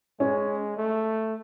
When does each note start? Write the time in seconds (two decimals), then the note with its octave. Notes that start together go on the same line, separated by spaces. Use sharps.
0.20 G#3 C#4
0.77 A3